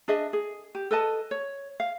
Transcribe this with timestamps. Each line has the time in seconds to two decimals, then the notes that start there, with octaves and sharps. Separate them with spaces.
0.08 D4 G#4 D#5 E5
0.33 G#4
0.75 G4
0.91 A4 B4 D#5 A5
1.31 C#5
1.80 F5